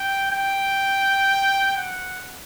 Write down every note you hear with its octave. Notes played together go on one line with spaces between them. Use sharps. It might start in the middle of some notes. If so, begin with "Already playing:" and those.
Already playing: G5
G5
F#5